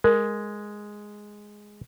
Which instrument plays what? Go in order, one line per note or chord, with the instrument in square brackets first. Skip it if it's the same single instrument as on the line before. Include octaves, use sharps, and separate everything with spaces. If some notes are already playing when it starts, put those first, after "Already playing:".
[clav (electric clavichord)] G#3 [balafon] A#4